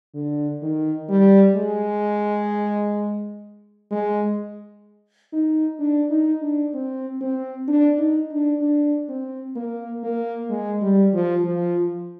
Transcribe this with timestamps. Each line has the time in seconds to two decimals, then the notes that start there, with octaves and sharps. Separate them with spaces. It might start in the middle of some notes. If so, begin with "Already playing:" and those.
0.14 D3
0.62 D#3
1.09 G3
1.56 G#3
3.91 G#3
5.33 D#4
5.80 D4
6.10 D#4
6.42 D4
6.74 C4
7.21 C4
7.68 D4
7.98 D#4
8.31 D4
8.61 D4
9.09 C4
9.56 A#3
10.04 A#3
10.50 G#3
10.82 G3
11.13 F3
11.44 F3